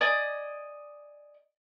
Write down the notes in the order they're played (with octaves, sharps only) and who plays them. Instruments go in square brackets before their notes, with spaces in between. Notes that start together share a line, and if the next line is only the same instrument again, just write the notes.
[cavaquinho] D5 D#5 G#5 D#6